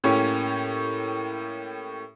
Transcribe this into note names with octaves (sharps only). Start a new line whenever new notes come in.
A2 A#3 C#4 G4 C#5